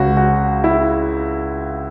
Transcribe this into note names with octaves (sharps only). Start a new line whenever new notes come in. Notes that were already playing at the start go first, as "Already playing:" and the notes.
Already playing: C#2 C#3 G#3 F#4
F#4
E4